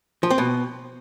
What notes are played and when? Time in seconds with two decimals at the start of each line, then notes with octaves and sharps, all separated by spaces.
0.23 F3
0.31 C4
0.38 B2